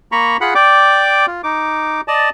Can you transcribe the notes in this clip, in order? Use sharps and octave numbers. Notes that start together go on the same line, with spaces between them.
A#3 A#5 B5 C#6
F4 G#4 F#5 B5 F#6
D5 G5 D6
F4
D#4 D6
D5 D#5 A5